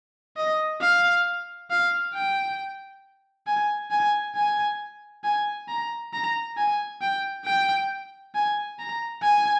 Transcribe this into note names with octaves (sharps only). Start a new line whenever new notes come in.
D#5
F5
F5
G5
G#5
G#5
G#5
G#5
A#5
A#5
G#5
G5
G5
G#5
A#5
G#5